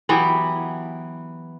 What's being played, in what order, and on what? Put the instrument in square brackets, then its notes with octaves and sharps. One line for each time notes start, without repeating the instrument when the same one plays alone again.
[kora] E3 F#3 B3 G4